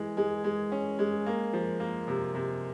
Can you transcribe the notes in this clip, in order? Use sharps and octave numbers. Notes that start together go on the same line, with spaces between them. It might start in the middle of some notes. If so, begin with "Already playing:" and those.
Already playing: E3 G#3
G#3
G#3
C#4
G#3
A#3
F3
A#3
C3
C3